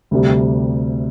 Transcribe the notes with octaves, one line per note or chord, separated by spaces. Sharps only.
D2 C3 G3